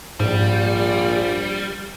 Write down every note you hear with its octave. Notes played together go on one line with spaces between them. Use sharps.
A#1 G#2 G3